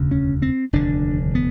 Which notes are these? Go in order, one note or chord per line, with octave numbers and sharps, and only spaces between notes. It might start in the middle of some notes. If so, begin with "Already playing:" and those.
Already playing: E1 D2 C#3
C#4
C4
F1 D#2 D3 D4
B3